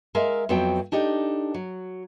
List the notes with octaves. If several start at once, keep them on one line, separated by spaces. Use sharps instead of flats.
G#3 A#4 E5 F5
F2 F#3 B3 C4 G5
D4 D#4 G4 A4
F#3